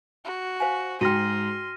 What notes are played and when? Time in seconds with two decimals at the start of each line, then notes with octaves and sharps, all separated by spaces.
0.24 F#4
0.60 C5 F5 G#5
1.01 G#2 F#4 G5 C6 F6 A#6 D#7